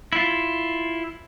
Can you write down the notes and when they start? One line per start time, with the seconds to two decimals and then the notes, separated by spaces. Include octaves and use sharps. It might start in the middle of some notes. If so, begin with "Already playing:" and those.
0.13 E4 F4